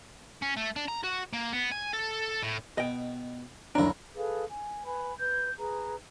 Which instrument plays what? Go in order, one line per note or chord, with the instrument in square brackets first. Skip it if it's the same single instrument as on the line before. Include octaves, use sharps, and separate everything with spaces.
[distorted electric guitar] C#4
A3
D4
A#5
F#4
A#3
B3
G#5
A4
A2
[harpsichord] B2 [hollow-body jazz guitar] D#5 G5
[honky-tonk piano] F#1 D2 A#5 [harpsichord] C#4 E4 [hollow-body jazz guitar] D4
[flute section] G#4 A4 B4 F5
G#5
B4 G#5 B5
B4 G6
G#4 B4 A#5